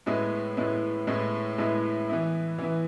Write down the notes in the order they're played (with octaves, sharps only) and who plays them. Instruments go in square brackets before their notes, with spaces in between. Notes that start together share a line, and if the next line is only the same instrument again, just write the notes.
[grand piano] A2 G#3 B3 E4
A2 G#3 B3 E4
A2 G#3 B3 E4
A2 G#3 B3 E4
E3 B3 E4
E3 B3 E4